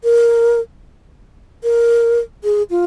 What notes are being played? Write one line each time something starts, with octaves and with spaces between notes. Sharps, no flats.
A#4
A#4
G#4
F4